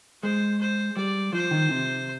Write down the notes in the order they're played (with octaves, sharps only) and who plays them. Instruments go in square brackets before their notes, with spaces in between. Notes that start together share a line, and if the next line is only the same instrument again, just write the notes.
[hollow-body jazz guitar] G#3 [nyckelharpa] C5
[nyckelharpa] C5
[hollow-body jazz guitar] G3 [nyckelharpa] D5
[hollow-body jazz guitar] F3 [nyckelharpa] C5
[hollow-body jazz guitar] D#3
C3